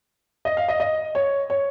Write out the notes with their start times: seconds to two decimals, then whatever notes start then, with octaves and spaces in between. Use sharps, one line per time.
0.45 D#5
0.57 F5
0.68 D#5
0.80 D#5
1.15 C#5
1.50 C#5